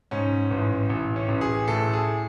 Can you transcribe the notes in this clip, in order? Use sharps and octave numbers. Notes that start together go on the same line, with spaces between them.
G#2 C#4
A1
A1
C#4
A1
G#4
A2 A4
G#4